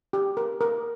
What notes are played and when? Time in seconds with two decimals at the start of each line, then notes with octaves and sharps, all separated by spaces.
0.13 G4
0.37 A#4
0.61 A#4